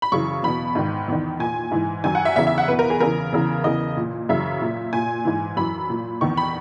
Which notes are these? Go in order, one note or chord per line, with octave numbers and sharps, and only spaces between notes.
B5
F#2 C#3 E3 C#6
E2 B2 B5
G#2 D#3
E2 D#3
A#2 G#5
G#2 E3
F#2 D#3 G#5
F#5
E5
E2 C#3 E3 E5
E5
F#5
E2 B2 B4
A#4
G#4
E2 C#3 E3 A#4
E2 C#3 E3
E2 C#3 E3 D#5
A#2
F#2 C#3 E3 E5
A#2
A#2 G#5
G#2 E3
F#2 E3 B5
A#2
E2 D#3 C#6
B5